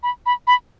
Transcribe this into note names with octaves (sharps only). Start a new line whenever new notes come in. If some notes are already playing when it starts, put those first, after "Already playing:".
B5
B5
B5